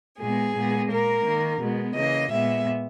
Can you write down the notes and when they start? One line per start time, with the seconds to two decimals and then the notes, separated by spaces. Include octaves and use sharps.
0.19 A#2 G#3 B3 G#4
0.54 A#2 G#3 B3
0.89 A#2 A#3 A#4
1.24 D#3 A#3
1.60 B2 G#3 B3
1.95 C#3 E3 A#3 D#5
2.30 A#2 G#3 B3 E5